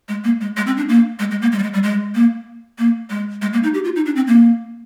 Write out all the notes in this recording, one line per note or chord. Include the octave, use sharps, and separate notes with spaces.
G#3
A#3
G#3
G#3
C4
D4
A#3
G#3
G#3
A#3
G#3
G3
G#3
G3
G#3
A#3
A#3
G#3
G#3
A#3
D#4
G4
F4
D#4
D4
C4
A#3